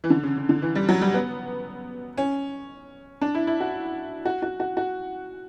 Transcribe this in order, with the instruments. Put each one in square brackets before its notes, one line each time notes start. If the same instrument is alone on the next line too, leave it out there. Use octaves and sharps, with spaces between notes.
[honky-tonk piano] E3
D3
C#3
C#3
D3
E3
G3
F#3
G3
B3
C#4
D4
E4
E4
F#4
F#4
F#4
F#4
F#4